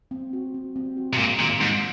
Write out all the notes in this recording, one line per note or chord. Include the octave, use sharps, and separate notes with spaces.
C4
F#4
C4
C4
F#4
C3
A#2 G#3
A#2 D#3
G#2 D#3